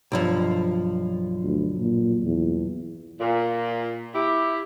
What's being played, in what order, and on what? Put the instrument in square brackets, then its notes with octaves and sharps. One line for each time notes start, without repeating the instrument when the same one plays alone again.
[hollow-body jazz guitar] B1 G2 F3
[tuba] D2
A#2
E2
[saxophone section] A#2
E4 G4